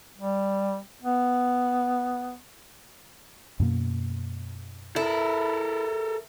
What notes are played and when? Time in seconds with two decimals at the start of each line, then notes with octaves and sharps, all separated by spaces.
0.19 G3
1.02 B3
3.60 F#2 B2 A#3
4.96 E4 A4 A#4